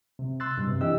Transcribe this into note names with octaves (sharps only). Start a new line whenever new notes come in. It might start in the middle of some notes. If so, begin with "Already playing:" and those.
C3
C6 E6 F#6 A6
G2 B2
C3
E3 D4 G4 D#5 E6